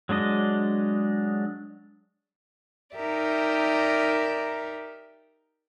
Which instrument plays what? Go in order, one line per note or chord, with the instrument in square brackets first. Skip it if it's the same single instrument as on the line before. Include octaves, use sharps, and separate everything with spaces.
[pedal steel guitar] F#3 G#3 D4 D#5
[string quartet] D#4 G4 A#4 D5 E5